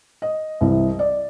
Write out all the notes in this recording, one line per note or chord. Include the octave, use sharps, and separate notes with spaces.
D#5
C2 C3 E3
D5